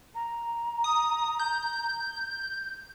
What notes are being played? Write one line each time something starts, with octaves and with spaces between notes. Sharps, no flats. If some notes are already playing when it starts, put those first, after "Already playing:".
A#5
D#6
G6